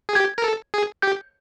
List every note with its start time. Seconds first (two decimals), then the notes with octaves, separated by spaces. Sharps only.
0.09 G#4
0.15 G4 G#6
0.38 A#4
0.44 A4
0.74 G#4
1.02 G4 G6